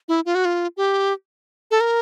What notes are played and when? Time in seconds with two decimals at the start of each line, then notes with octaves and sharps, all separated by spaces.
0.08 E4
0.26 F4
0.35 F#4
0.45 F4
0.77 G4
1.71 A4
1.81 A#4